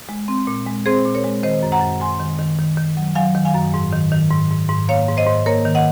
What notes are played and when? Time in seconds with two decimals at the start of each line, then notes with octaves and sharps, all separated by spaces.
0.09 G#3
0.28 C4
0.47 A#2
0.67 G#3
0.86 C4 G#4 C5
1.05 A#2
1.15 A#4 C#5
1.24 G#3
1.43 D#3 C5 D#5
1.63 F#2
1.72 F#5 A#5
1.81 F#2
2.00 F#2 G#5 C6
2.20 D#3
2.39 D#3
2.59 D#3
2.77 D#3
2.97 F#3
3.15 F#3 F5 G#5
3.35 D#3
3.45 F5 G#5
3.55 F#2
3.74 G#2
3.93 D#3
4.12 D#3
4.31 G#2
4.51 G#2
4.69 G#2
4.89 A#3 C#5 F5
5.08 G#2
5.17 C5 D#5
5.27 G#2
5.46 A#3 A#4 C#5
5.65 D#3
5.75 D#5 F#5